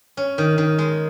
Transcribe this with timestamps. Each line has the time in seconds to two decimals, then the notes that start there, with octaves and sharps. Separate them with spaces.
0.17 C#4
0.38 D#3
0.58 D#3
0.79 G#3